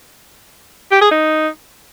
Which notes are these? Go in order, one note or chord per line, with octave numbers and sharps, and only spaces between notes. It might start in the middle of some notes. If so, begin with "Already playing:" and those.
G4
G#4
D#4